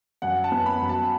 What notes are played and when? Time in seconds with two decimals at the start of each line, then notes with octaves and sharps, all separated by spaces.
0.22 F#2 F#5
0.44 A5
0.52 B3
0.66 B5
0.81 F#2
0.89 A5